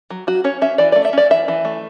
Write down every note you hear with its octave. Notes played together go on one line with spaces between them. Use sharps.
F#3
F#3 F#4
C#4 C#5
C#4 E5
E3 D5
A3 D5
E5
C#4 D5
E3 E5
E3
A3